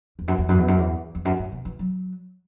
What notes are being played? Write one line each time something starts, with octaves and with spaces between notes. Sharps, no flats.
E2
F#2
E2
F#2
E2
F#2
E2
E2
F#2
G#2
B2
E3
F#3